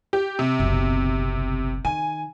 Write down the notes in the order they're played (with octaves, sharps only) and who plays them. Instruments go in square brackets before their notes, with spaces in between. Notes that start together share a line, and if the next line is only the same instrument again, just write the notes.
[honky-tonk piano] G4
C3
[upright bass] F#1 B1
[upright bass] D#3 [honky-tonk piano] G#5